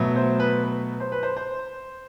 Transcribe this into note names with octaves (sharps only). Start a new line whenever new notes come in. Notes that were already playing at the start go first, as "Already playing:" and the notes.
Already playing: B2 F#3 A3
C5
B4
B4
C5
B4
C5
C5